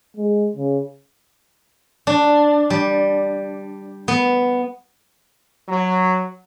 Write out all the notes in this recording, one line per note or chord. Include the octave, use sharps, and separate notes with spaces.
G#3
C#3
D4
G3
B3
F#3